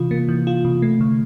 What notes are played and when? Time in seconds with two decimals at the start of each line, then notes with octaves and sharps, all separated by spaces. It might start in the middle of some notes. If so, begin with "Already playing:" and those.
Already playing: C3 E3 F4
0.11 A#3
0.28 E3
0.47 F4
0.65 C3
0.82 A3
1.01 D3